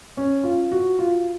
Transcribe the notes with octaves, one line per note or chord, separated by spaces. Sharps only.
C#4
F4
F#4
F4